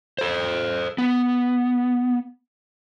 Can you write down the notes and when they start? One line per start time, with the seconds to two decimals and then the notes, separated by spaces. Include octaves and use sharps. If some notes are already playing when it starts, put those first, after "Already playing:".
0.18 A4 C5
0.98 B3